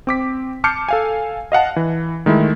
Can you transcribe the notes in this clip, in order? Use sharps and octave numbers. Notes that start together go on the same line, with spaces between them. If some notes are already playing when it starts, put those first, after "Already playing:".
C4 D6 B6
A5 D6 F6 G6 C7 C#7
A4 F5 G#5
D#5 F5 F#5 A5
E3
D#3 G#3 A3 E4